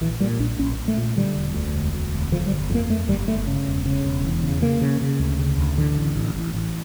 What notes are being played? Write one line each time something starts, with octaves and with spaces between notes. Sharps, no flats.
A#1 E3
A#2 G3
A#1 D4
A#1 C#4
A#1
A3
A#2
D3 G3
E1
D2
E1
D2
E1
D3 F3
G3
G1
F2 A#3
F2 A3
G1 G3
G1 A3
C#3
E1
C#3
E1
E2
C#3
C#3 A#3
C#3
C#3
D2
C#3
D2
A1 D3
A1
A1
A1
A1